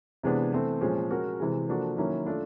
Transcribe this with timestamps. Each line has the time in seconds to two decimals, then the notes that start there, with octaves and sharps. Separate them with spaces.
0.23 C3 E3 G#3 B3 D4
0.53 E3 A3 C4
0.81 A#2 F3 G#3 C#4
1.10 G#3 C#4 F#4 A#4 C#5
1.40 C3 E3 G#3
1.69 F3 A#3 D4 F#4 A4
1.97 D#3 F#3 A#3 C#4 E4
2.26 A3 D4 F4